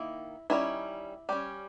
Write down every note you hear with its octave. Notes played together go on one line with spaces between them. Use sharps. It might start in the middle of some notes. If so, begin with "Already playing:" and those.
Already playing: D#3 A#3 E4
D#3 G3 C#4 E4
G3 C#4 G4